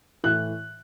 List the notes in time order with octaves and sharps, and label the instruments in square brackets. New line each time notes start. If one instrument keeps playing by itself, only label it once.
[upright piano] A2 E3 F#6